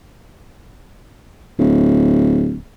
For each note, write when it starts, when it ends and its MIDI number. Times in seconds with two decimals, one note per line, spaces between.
1.59 2.57 26